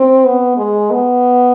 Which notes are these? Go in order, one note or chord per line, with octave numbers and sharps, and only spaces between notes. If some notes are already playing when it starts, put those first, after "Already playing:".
Already playing: C4
B3
G#3
B3